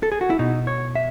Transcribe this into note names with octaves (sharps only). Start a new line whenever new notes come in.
A4
G#4
F#4
E4
B2 D#4
C#5
E5